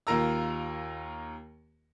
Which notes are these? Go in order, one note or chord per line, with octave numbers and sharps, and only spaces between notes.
D#2 A#3 F4 A#4 A#5 E6